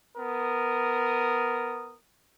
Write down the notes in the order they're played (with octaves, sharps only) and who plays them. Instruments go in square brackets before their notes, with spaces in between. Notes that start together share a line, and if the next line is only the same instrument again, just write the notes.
[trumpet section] B3 A#4 D#6